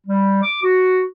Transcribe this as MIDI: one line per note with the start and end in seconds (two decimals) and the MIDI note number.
0.07 0.42 55
0.43 0.60 86
0.63 1.02 66